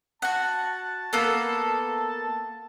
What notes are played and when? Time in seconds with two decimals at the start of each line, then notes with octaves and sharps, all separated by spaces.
0.22 F#4 F#5 A5
1.13 A#3 B3 A4